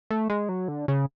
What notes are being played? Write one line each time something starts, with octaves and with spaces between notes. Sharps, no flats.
A3
G#3
F#3
D3
C#3